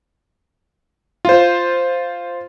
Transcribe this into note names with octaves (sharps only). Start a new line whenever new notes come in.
F4 C5